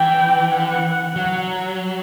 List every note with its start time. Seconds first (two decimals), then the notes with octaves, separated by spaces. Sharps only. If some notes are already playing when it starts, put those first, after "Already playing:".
Already playing: E3 G5
0.52 F#5
1.16 F#3 F#5